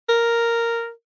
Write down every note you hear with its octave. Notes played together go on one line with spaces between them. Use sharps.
A#4